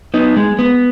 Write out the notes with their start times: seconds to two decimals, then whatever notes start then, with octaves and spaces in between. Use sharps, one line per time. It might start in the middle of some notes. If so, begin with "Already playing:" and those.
0.14 B3 D#4
0.37 G#3
0.59 B3